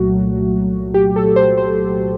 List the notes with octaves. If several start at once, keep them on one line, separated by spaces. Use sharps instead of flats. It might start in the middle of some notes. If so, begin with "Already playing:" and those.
Already playing: C2 A#2 F#3 A3 F#4
G4
A4
C5
C5